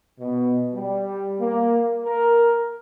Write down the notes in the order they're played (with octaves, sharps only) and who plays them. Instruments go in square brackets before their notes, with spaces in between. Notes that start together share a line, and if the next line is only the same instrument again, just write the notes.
[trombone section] B2
G3
A#3
A#4